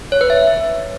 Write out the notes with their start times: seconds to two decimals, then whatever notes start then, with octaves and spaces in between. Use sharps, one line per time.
0.12 C#5
0.21 B4
0.30 E5